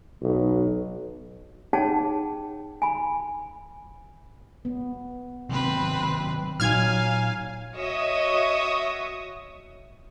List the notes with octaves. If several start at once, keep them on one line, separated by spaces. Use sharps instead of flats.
B1
D#4 G#4 C#5 F#5 G5 A5
G#5 B5
B3
C3 D#3 F#3 C4 B4
A#2 F#3 D#4 F5 G#5 F6 G#6
F#4 C#5 D#5 E5 C#6 D#6